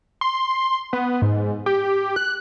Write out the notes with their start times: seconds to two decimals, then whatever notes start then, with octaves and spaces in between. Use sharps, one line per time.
0.21 C6
0.93 B3
1.22 G#2
1.66 G4
2.16 F#6